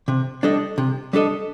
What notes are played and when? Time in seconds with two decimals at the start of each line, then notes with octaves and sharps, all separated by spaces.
0.08 C3
0.43 G3 D4 A4 D#5
0.78 C3
1.13 G3 D4 A4 D#5